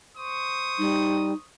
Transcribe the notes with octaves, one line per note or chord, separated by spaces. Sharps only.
C5 C#6 D#6
G3 D#4